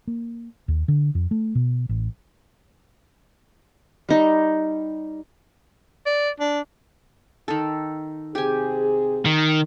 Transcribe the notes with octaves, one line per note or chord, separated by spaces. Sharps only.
A#3
D#2
D3
F2
A3
B2
A1
G3 D#4
D5
D4
D#3 A4
C3 C4 G4 G#4 G#5
D#3